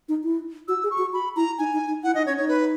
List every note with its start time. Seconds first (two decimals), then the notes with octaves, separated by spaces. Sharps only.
0.09 D#4
0.24 E4
0.68 F#4 E6
0.84 G#4
0.91 C#6
0.98 F#4
1.13 F#4 B5
1.36 E4 A#5
1.58 D#4 G#5
1.73 D#4
1.88 D#4
2.03 E4 F#5
2.15 D#4 D#5
2.26 C#4 C#5
2.37 D#4 C#5
2.48 B4